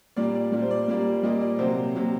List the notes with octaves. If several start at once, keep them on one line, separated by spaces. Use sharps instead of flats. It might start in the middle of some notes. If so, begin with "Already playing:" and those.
A#2 G3 A#3 D5
D5
A#2 G3 A#3 D5
C5
D5
A#2 G3 A#3
A#2 G3 A#3 D#5
D5
C3 F#3 A#3 C5
C3 F#3 A#3